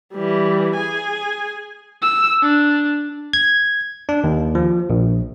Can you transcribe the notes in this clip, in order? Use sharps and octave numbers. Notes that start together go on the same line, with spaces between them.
E3 G3
G#4 G#5
E6
D4
G#6
D4
D#2
F3
A#1